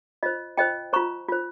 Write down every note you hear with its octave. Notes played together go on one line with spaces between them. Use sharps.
F4 C5 D#5
F4 C5 D#5 G5
F4 C5 A#5 C#6
F4 C5